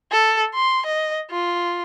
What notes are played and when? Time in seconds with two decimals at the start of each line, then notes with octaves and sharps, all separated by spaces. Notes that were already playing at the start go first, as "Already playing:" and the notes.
0.12 A4
0.55 C6
0.86 D#5
1.31 F4